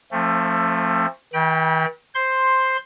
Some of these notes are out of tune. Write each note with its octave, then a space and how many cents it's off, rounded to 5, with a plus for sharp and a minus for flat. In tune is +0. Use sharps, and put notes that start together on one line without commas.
F3 +0 A3 +20 C4 +40
E3 -45 G5 +0 B5 -35
C5 +5 C6 +0